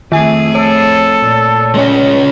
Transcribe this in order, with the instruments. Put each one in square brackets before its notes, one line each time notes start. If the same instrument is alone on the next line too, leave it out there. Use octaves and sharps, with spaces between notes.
[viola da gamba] F2 A3 G#4 [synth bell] D#3 G#5
[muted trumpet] A4 [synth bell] C#5
[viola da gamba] A#2
[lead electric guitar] G#3 C#4